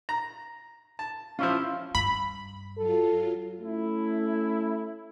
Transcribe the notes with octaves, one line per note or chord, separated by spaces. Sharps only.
A#5
A5
F3 C#4 E4 F4 E5
G2 B5
F#3 F4 A4
A3 C#4 E4